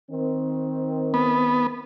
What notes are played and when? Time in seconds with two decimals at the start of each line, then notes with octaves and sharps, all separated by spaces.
0.11 D#3 C4
1.14 B3